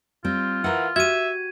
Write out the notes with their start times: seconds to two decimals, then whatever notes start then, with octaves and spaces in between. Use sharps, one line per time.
0.24 G3 C4 F4
0.64 E3 A#4 F#5
0.96 F#4 G4 E5 G#6 D#7